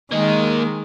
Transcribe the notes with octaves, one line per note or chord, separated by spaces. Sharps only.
D#3 G#3 A#3 D#5